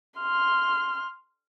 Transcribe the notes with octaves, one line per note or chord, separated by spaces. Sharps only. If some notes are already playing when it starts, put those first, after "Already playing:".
C6 F6